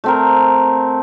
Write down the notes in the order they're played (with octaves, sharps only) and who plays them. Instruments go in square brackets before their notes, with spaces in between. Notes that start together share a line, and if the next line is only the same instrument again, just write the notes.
[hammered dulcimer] A3 C4 A#4